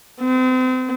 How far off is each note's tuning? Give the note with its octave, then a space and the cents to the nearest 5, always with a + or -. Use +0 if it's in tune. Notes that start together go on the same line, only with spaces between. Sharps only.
C4 -35